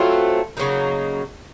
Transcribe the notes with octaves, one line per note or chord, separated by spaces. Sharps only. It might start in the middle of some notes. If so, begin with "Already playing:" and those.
Already playing: F#3 A3 C4 F4
C#3 F#3 A#3 D#4